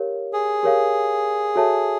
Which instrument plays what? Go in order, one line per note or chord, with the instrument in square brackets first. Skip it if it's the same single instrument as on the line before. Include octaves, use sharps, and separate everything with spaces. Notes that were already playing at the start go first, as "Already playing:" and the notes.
Already playing: [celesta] G4 A#4 C#5 F5
[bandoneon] G#4
[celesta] G4 A#4 C#5 F5
F#4 A4 C#5 E5 A5